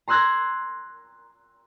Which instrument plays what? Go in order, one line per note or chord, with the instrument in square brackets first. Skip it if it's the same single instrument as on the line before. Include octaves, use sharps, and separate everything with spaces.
[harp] A#5 C6 E6 F#6 G#6 A#6